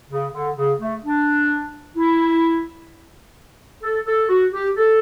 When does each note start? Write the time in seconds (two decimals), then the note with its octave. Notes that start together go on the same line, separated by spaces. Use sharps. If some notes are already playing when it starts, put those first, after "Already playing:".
0.10 C#3
0.33 D3
0.57 C#3
0.80 A3
1.04 D4
1.97 E4
3.83 A4
4.07 A4
4.29 F#4
4.53 G4
4.77 A4